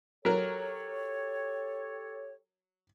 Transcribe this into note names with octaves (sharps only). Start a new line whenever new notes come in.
F#3 G4 A4 A#4 C#5